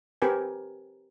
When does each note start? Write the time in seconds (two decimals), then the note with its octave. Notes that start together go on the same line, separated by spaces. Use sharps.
0.22 C4 G4 A#4 B4 G#5